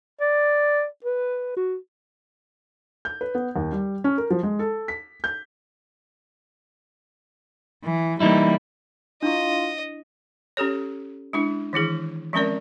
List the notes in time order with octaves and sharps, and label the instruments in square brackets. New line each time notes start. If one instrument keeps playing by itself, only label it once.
[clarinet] D5
B4
F#4
[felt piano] G6
B4
B3
D#2
G3
C#4
A#4
F3
G#3
A4
B6
G6
[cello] E3
[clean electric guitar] E3 D#4 E4 [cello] G3 A#3
[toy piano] D4 E4 C#6 [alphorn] F4 [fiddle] D#5
[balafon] C#4 G4 A4 C#5
G#3 D4 E4
D#3 E3 E4 G#4
F3 G#3 C4 C#4 A#4 D5